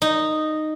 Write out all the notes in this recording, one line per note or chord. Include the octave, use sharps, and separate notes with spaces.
D#4